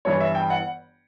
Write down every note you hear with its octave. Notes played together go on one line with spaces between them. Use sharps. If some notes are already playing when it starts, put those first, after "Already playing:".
G1 G2 E3 C#5
E5
G5
F#5